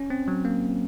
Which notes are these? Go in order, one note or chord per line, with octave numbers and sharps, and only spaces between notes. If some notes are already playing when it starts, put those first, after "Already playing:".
Already playing: C#4
C4
F#3
A#3